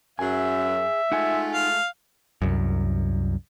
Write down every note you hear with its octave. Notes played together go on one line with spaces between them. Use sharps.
F#2 G#4 E5 G#5
G#3 A3 D#4 F4 F#5 G#5
F5
C2 F#2